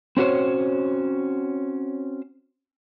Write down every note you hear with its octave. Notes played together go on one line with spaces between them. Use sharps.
C4 C#4 F#4 C5 C#5